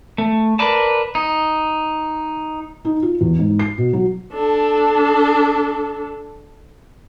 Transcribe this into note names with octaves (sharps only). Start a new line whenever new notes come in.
A3
A#4 B4 D5 A5
D#4
D#4
F4
E2
G#2
C7
B2
F#3
D4 A4